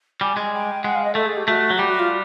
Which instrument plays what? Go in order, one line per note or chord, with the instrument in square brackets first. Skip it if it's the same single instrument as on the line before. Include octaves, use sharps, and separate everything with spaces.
[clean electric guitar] G3 [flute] G#5
[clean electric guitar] G#3
[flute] G5
[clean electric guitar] G#3 [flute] F#5
[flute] F5
D#5
[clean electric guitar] A3 [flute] A4
[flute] G#4
G4
[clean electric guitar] A3 [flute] F#4
[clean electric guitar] F#3
[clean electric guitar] G3 [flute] G4
[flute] F#4
F4